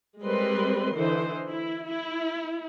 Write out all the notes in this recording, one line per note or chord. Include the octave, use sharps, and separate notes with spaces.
G3 G#3 C4 A#4 B4 C6
D3 E3 D#4 C5
E4
E4